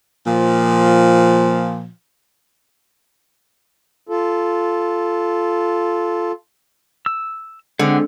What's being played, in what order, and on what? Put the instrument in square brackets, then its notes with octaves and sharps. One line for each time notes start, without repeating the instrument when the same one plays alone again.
[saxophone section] A#2 F3
[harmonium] F4 A4
[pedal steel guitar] E6
[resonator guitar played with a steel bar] D3 [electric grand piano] G#3 C4 [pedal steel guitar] F#5